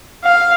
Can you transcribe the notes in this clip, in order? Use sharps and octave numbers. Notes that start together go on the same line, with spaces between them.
F5